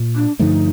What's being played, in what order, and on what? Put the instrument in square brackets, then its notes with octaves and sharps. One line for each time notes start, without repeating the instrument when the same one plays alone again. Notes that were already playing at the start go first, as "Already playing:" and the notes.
Already playing: [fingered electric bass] A#2
[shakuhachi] D4
[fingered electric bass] G2 D3 F3 A3 [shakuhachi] D#4